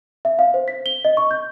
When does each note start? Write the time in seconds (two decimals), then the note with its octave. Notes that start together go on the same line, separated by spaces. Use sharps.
0.25 E5
0.39 F5
0.54 C5
0.68 B6
0.86 G7
1.05 D#5
1.17 C#6
1.31 G6